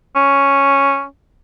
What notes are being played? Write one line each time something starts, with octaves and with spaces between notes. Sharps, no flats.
C#4